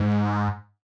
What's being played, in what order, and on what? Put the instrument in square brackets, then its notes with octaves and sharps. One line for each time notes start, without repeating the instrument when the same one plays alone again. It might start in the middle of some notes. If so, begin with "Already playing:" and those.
Already playing: [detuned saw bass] G#2